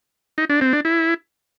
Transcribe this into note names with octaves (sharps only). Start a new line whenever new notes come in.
D#4
D4
C4
D4
E4